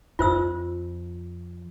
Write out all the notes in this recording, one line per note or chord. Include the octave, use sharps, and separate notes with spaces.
F2 F4 C5 E6